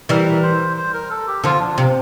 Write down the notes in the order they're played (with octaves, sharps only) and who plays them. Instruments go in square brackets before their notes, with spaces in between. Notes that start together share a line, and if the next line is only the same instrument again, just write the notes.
[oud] E3 G3 [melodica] A#4
[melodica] C5
C5
A#4
A4
G4
[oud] D3 F3 [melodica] F4
[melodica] D4
[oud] C3 [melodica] C4